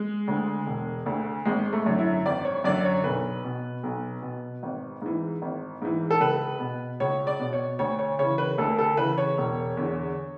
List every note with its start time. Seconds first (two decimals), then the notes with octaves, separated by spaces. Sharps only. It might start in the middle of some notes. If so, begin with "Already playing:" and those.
Already playing: G#3
0.28 D2 D3
0.67 E1
1.06 D2 D3
1.45 G#1 G#3
1.73 A3
1.86 F#2 D3
1.99 E4
2.26 G#1 D5
2.45 C#5
2.64 F#2 D3 D5
2.85 C#5
3.04 B1 B4
3.44 B2
3.83 B1
4.22 B2
4.63 G#1
5.02 G#2 E3
5.42 G#1
5.82 G#2 E3
6.11 A4
6.20 C#2 B4
6.60 B2
7.00 C#2 C#5
7.27 D5
7.39 B2
7.53 C#5
7.79 D2 C#5
7.99 C#5
8.19 C#3 E3 C#5
8.38 B4
8.58 D2 A4
8.78 A4
8.97 C#3 E3 B4
9.18 C#5
9.38 E1
9.77 E2 D3